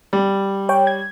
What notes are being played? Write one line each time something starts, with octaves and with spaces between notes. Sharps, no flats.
G3
C#5 G5
G#6